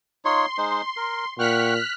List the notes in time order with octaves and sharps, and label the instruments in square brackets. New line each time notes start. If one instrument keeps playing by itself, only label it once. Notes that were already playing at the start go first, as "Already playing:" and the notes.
[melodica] D#4 F4 C#5 [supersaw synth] C6
[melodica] G#3 D#4 C5
A#4
[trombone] A#2 [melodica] F#5 G5 C#6 [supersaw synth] F6 F#6 B6